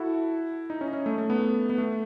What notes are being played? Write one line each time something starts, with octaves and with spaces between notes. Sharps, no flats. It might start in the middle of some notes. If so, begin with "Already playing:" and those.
Already playing: E4 F#4 A4
D#4
C#4
D#4
C#4
A3
A3
B3
B3
A3